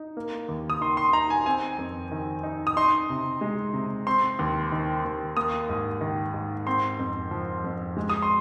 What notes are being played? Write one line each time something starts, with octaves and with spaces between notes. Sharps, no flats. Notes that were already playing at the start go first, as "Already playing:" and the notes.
Already playing: D#4
A#3
D#2
D#6
D#3 C6
C6
D#4 A#5
G#5
C4 G#5
F2
D#3
D#4
D#6
D#4 C6
C3
G#3
C3
C4 C6
D#2
D#3
D#2
A#3 D#6
G#2
D#3
G#2
C4 C6
F2
F3
F2
G#3
D#6
C6